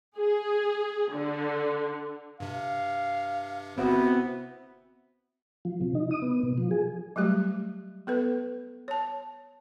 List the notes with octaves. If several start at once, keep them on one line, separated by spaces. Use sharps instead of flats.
G#4
D3
G2 C3 F5
G1 C3 B3 C4 E4 F#4
F3
C3
D#4
D#6
B3
B2
F3
G#4
F#3 G3 A3 G4
B3 A4 B4
C#5 A5